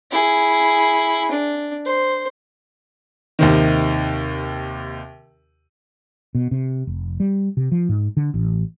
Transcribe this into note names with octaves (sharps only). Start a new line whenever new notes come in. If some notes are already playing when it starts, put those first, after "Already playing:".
E4 G#4
D4
C5
D#2 C3 D#3
B2
C3
F1
G3
C3
F3
G#2
D3
A1